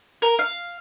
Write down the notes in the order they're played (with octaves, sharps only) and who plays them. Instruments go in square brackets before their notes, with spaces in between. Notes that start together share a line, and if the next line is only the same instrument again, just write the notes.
[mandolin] A#4
F5